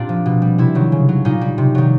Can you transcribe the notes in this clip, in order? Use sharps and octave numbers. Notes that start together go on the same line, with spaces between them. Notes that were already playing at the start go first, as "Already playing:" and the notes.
Already playing: A#2 C4 D4 F4 G4
F3
B2
G3
C3 E4
D#3 F#3
C#3
F#3
A#2 D#4
G3
C3
D#3 F#3